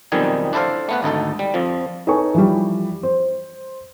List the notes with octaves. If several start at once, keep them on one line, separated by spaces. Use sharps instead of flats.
B1 F2 D#3 G3 D#4 G#5
D4 E4 A4 C5 F5
A3 B3 B4
G#1 D2 D#4 A4
G3
F2 F3
D#4 A4 B4 C#5 G#5 C#6
E3 F3 G3
C5